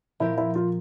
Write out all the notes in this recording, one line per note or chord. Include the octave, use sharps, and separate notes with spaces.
A#2 F3 C4 E4 G4 A#4
E4
F4